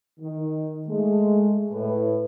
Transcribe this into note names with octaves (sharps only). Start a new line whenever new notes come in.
D#3
G#3 A3
A2 B4